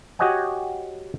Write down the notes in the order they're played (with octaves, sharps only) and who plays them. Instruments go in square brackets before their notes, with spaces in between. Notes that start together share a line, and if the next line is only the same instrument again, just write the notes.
[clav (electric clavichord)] F#4 G4 C#5 D#5 F#5 G#5